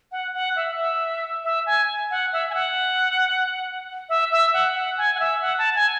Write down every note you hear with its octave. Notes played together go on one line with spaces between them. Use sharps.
F#5
F#5
E5
E5
E5
G#5
F#5
E5
G#5
F#5
E5
E5
F#5
F#5
G#5
F#5
E5
F#5
A5
G#5